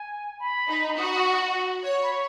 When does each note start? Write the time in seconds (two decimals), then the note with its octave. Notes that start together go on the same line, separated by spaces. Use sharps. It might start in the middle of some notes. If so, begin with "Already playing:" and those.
Already playing: G#5
0.40 B5
0.68 D#4
0.97 F#4 D#6
1.07 C#6
1.16 D#6
1.25 C#6
1.84 C#5
2.03 B5
2.12 C#6